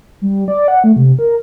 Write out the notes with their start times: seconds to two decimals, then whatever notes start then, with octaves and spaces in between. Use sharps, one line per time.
0.22 G3
0.48 D5
0.68 F#5
0.84 A3
0.96 C3
1.19 A#4